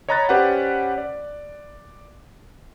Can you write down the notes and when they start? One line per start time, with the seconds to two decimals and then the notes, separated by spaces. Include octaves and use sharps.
0.09 C#5 D#5 A#5 B5 F#6 A6
0.29 C#4 G4 B4 C5 D5 F#5
0.98 D5